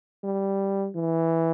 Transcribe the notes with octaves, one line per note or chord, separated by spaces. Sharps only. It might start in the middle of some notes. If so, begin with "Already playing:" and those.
G3
E3